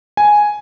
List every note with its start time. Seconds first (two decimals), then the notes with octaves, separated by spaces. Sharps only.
0.17 G#5